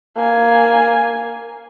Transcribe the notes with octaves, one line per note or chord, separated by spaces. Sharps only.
A#3 G#5